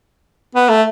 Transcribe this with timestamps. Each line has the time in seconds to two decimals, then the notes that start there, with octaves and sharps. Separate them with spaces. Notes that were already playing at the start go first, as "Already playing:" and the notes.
0.55 B3
0.69 A3